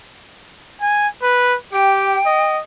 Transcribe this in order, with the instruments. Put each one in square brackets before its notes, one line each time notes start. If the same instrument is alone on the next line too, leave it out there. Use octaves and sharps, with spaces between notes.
[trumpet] G#5
B4
[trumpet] G4 [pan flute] G5
[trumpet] D#5